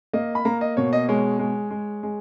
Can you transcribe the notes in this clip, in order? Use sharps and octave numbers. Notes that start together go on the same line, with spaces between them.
A#3 D#5
B5
A#3 A#5
D#5
B2 C#5
D#5
G#3 C#5
G#3
G#3
G#3